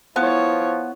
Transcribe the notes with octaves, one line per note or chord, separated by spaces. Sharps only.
F3 B3 E4 C#5